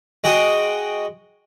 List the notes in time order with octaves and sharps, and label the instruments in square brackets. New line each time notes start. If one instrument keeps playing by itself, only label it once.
[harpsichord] G#3 F#4 G5 D#6